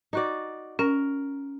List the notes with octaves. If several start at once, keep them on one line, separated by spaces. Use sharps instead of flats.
D#4 F#4 D5
C#4 A#4